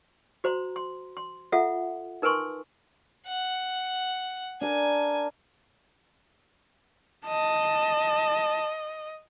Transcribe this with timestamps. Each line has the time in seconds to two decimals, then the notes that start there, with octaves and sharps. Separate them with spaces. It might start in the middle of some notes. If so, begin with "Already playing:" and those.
0.44 F#4 C5 A#5 C6
0.76 C6
1.17 C6
1.52 F4 A4 E5 F#5
2.22 D#4 A#4 B4 G#5 C6 C#6
3.27 F#5
4.61 D4 A#4 G#5
7.27 D#5 A5